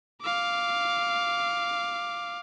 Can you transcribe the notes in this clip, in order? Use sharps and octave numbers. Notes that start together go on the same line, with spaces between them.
F5 D6